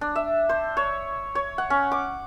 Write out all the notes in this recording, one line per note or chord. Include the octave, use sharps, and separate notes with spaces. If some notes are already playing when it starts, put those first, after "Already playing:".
D4
E5
C5
C#5
C#5
F#5
C#4
D6